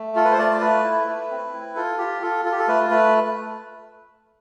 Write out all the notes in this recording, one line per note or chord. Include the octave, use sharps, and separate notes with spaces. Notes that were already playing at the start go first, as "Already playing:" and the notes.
Already playing: A3
F4 A4
B4
C5
A3 D5
A3 B4
E4
A3
C4
E4
F4 A4
F4 G4
F4 A4
F4 A4
G4
A4
A3 B4
A3 B4